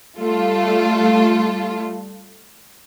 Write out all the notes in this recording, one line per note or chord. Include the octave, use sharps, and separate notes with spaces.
G3 A3 F4 A4